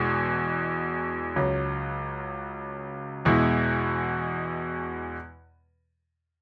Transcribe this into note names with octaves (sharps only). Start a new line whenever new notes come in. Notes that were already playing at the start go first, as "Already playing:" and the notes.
Already playing: E2 B2 G#3
C#2 C#3 F#3
E2 B2 G#3 E4